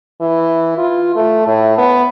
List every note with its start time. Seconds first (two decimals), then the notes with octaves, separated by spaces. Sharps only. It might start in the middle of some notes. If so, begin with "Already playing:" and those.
0.21 E3
0.78 F4
1.15 A3
1.47 A2
1.78 B3